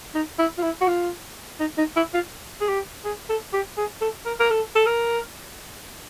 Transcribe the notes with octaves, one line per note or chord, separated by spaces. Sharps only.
D#4
E4
F4
E4
F#4
F4
D#4
D#4
E4
F4
G#4
G4
G#4
A4
G4
G#4
A4
A#4
A#4
A4
A4
A#4